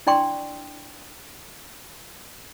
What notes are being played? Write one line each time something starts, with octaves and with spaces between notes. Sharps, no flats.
D4 E4 D5 G5 C6 C#6